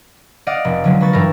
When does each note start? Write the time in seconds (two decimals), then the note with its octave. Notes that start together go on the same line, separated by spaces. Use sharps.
0.47 D5 D#5 F5 F#5
0.65 F1
0.84 D3 F3 F#3 G#3
1.00 A#3 B4 C#6 A6
1.13 G2 E3 A4 A#4